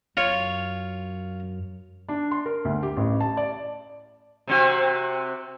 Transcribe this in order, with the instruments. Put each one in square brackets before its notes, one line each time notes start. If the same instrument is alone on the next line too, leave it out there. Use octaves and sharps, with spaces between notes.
[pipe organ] F#2 [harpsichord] F4 C#5
[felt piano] D4
C6
A#4
D2
G4
A1
A5
D5
[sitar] C3 C4 F#4